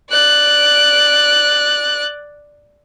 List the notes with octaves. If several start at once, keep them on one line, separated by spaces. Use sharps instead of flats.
D5 F#6